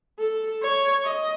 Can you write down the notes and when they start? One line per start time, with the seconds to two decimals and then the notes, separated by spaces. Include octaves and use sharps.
0.19 A4
0.62 C#5
1.05 D#5